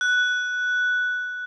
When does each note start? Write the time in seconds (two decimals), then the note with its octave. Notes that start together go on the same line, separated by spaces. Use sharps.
0.01 F#6